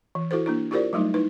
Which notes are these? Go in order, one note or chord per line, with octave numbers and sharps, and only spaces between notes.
E3
E4 F#4 A4 C5
A#3 D4 E4
E4 F4 G4 A#4 C5 D5
F#3 G3 A3 D#4
D#4 E4 B4